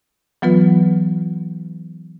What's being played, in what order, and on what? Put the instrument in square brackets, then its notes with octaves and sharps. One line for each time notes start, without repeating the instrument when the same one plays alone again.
[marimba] E3 F#3 B3 F4 B4